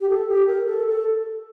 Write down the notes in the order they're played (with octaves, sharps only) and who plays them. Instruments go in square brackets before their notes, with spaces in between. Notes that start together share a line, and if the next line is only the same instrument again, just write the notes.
[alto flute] G4
A4
G4
A#4
A4
A4